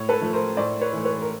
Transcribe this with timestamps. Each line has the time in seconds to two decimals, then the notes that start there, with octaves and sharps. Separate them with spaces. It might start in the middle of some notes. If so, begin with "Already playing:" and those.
Already playing: A2 C#5
0.09 A4 B4
0.21 F3 A3
0.33 A#4 C5
0.57 A2 C5 D5
0.81 B4 C#5
0.93 E3 A3
1.05 B4 C#5
1.22 A#4